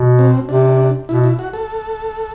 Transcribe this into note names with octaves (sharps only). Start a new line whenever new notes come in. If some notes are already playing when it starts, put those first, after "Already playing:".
Already playing: B2
C4
C3 D4
B2 E4
E4
F#4
A4